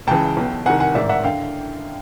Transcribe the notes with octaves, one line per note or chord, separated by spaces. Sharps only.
C#2 C#3 E3 G5 A5
B1 B2
C2 C3 D#3 F#5 G#5
F#5 G#5
A1 G#2 D#3 D5 E5
E5 F#5
D3 F5 G5